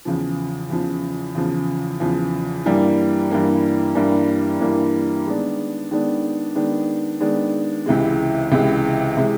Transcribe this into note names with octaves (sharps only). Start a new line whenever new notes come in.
E2 C#3 F3
E2 C#3 F3
E2 C#3 F3
E2 C#3 F3
G2 E3 G3 A#3
G2 E3 G3 A#3
G2 E3 G3 A#3
G2 E3 G3 A#3
D#3 G#3 B3 D4
D#3 G#3 B3 D4
D#3 G#3 B3 D4
D#3 G#3 B3 D4
C#2 C3 E3 G#3
C#2 C3 E3 G#3
C3 E3 G#3